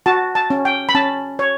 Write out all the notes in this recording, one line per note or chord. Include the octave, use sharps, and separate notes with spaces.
F#4 A5
A5
C#4
G5
B5
C#4 A5
C#5